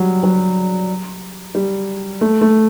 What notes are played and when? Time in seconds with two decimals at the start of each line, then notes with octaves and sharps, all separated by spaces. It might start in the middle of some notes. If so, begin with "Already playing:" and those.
Already playing: F#3 G3
0.23 F#3
1.55 G3
2.21 A3
2.41 A3